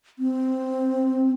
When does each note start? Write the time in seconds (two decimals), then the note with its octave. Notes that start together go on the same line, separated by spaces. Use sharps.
0.19 C4